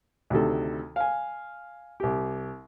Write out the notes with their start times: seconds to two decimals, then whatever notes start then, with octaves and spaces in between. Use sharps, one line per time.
0.30 D2 C3 D#3 A4
0.96 F5 G#5
2.00 C2 G4